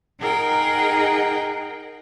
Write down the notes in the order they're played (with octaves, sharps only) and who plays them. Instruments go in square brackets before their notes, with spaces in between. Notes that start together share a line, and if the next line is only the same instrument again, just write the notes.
[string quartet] D#4 G#4 A#4 F#5 G5